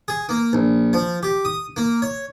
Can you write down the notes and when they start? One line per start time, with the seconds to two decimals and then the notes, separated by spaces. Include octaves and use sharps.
0.08 G#4
0.29 A#3
0.53 A#1
0.93 F3
1.23 G4
1.45 D#6
1.76 A#3
2.02 C#5